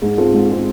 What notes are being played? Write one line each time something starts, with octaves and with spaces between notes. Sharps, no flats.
G#2 G#4
G#3 C4 F4 A4
G#2
G#3 C4